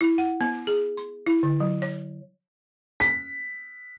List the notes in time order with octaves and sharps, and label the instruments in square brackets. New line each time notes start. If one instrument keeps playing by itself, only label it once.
[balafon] E4
F#5
B3
G#4
C6
E4
D3
F#3
C#5
[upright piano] B6